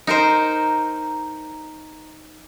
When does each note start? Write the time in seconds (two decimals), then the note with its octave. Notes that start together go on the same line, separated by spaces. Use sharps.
0.07 D#4 A#4 C5